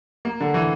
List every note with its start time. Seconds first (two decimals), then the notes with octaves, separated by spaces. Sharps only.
0.25 A#3
0.41 D3
0.54 E3